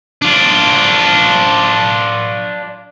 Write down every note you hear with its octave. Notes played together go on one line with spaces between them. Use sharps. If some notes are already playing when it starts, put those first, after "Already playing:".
D4 F4